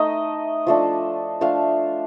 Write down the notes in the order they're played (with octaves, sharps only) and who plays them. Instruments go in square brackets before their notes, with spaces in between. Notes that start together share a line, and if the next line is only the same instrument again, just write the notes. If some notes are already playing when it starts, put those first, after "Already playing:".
Already playing: [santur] A3 D#4 D#5
F3 A3 D4
F3 A3 D4 F5